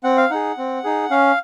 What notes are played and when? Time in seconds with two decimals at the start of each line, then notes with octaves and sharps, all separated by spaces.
0.04 C4 F#5
0.17 F5
0.30 D#4 G#4 F#5
0.58 C4
0.84 D#4 G#4
1.10 C#4 F5